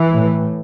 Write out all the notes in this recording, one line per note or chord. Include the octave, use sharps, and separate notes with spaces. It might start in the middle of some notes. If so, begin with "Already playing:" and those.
Already playing: E3
A2